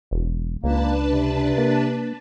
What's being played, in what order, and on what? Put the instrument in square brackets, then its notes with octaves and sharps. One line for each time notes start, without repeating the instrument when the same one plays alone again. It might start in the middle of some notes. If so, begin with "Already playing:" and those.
[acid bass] E1
[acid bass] C#2 [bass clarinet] A#3 [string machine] D4 B4 A5
[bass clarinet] C3
[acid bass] A#3